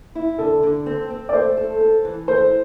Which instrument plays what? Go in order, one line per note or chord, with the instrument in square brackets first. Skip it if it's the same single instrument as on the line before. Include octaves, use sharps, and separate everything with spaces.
[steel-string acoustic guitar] E4
[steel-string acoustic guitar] D3 [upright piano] A4
[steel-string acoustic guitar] D3
C4
C4
[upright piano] D5
[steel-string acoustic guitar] A3 [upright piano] C5
[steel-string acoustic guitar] A4
A4
E3
[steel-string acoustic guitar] A3 [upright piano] C5